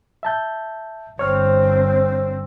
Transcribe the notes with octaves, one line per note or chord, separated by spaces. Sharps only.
E5 A5 G6
G1 C4 C5 C#5 F6